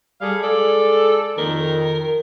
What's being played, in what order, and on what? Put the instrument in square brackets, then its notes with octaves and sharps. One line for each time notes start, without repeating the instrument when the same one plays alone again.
[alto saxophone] G3 [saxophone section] G#4 A4 F5
[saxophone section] G#3 D5 [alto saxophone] A4
[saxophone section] F2 D#3 [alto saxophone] A#4